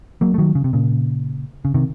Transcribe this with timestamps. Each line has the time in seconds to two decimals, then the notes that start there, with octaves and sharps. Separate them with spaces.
0.21 F#3 A#3
0.34 A3
0.38 D#3 F#3
0.55 C#3
0.64 C3
0.73 A#2 C#3
1.65 C#3
1.74 C3 D#3